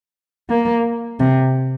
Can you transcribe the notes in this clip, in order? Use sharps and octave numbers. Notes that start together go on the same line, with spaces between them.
A#3
C3